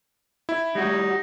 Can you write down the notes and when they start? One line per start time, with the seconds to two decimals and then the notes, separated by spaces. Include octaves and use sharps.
0.49 E4
0.75 G3 D#4 F#4